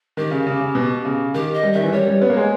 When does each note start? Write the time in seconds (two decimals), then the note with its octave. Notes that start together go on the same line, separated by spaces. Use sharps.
0.17 D#3 G4
0.31 C#3
0.47 C#3
0.61 C#3
0.75 B2
1.05 C#3
1.34 D#3 G4
1.53 D#5
1.63 G3
1.72 D#3 E5
1.83 E3
1.92 G3 C#5
2.07 G3
2.21 B3
2.30 A#3
2.37 G#3